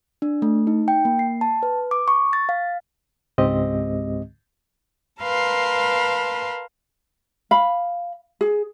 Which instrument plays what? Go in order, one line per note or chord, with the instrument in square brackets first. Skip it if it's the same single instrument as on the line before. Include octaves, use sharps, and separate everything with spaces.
[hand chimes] D4
A3
D#4
G5
A#3
C7
A5
B4
D6
C#6
A6
F5
[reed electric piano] C#2 G#2 G#3 C4 G4 D#5
[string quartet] A#4 B4 F5 A5 C6
[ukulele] F5 B5
G#4